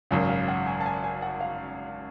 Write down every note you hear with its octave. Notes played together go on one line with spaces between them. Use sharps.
G#1 F#2 C#3 F5
F5
F#5
G#5
A5
G#5
G#5
F#5
F5